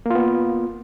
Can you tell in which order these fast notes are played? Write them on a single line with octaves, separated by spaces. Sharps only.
A#3 F4 B3